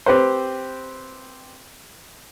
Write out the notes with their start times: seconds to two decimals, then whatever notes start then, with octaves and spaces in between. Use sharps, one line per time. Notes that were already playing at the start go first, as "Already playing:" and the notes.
0.06 C4 G4 B4 C5